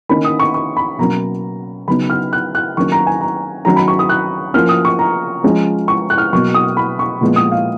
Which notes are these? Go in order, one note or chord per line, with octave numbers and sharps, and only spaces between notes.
D#3 A#3 C#4 B5
D#6
C#6
C#6
B5
B2 F#3 A#3 C#4 A#5
C#3 F#3 B3 D#4 B5
F6
F#6
F#6
D#3 F#3 A#3 C#4 C#6
A#5
G#5
A#5
D#3 F#3 C#4 A#5
B5
C#6
D#6
F#6
F3 A#3 C#4 F6
D#6
C#6
A#5
F3 G#3 C#4
C#6
F#6
F6
B2 F#3 A#3 C#6
D#6
B5
C#6
A#2 F3 G#3 B3
D#6
F5